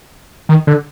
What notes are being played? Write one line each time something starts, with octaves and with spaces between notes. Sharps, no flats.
D#3
D3